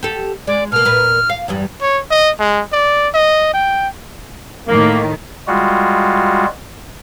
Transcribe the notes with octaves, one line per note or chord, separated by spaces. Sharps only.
G4 A4
G#3 D5
B2 A#3 F6
A#2 A#4 B4
F5
E2 G2 G3
C#5
D#5
G#3
D5
D#5
G5
A2 D#3 A#3
G3 G#3 F4 F#4